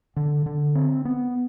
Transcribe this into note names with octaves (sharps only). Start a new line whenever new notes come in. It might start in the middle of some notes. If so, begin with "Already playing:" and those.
D3
D3
C4
B3